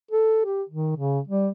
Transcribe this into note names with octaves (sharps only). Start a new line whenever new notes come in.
A4
G4
D#3
C#3
G3